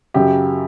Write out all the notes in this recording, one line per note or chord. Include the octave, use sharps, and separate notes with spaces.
F#2 C#3 F#3 G4